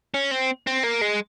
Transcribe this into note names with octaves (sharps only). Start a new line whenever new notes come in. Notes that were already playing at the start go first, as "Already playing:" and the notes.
C#4
C4
C4
A#3
G#3